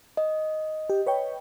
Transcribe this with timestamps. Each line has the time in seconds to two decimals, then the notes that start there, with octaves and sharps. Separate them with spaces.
0.17 D#5
0.90 G4
1.06 B4 C#5 G5